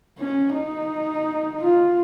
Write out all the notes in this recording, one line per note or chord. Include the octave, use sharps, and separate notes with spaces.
C#4
D#4
F4